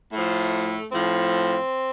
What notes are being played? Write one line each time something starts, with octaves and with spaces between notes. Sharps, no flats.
A2 F3 A3
A2 F3 C4